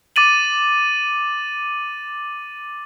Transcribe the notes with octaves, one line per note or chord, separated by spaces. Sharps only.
D6 A6 D#7 F#7